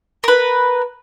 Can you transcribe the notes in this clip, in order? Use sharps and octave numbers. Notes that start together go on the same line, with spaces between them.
A#4 B4